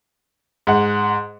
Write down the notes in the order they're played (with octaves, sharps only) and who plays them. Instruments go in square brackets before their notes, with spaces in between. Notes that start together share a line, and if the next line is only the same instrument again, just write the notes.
[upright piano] G#2 F#5